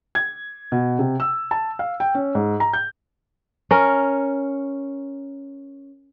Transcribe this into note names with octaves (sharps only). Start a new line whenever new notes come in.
G#6
B2
C3
E6
A5
F5
G5
C#4
G#2
A#5
G6
C#4 A#4